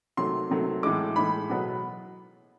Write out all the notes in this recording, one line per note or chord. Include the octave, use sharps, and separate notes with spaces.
C3 D#3 F#3 A3 C6
C3 D#3 F#3 A3
A2 E3 G#3 D6
A2 E3 G#3 B5
B2 F#3 B3